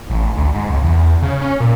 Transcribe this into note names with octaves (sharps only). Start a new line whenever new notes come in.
A1
D2
G#2
C#2
E2
C#3
C#4
A#2